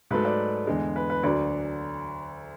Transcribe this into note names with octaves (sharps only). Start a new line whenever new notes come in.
G#2 F#3 A3 B4
D5
E2 D3 G#3
B4
B4
D2 D3 F#3 D5